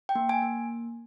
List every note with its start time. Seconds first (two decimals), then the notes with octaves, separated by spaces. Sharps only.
0.09 G5
0.15 A#3
0.29 G#5
0.42 A#3